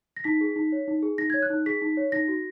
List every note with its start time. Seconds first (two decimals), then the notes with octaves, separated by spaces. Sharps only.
0.17 A#6
0.24 D#4 B6
0.41 G#4
0.56 D#4
0.72 C#5
0.87 D#4
1.03 G#4
1.18 D#4 A#6
1.30 G#6
1.34 C#5
1.42 F#6
1.50 D#4
1.66 G#4 B6
1.82 D#4
1.97 C#5
2.12 D#4 A#6
2.28 F#4